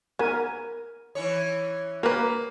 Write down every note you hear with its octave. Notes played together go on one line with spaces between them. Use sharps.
B3 A#4 G#5
E3 C#4 C#5
A#3 A#4 B4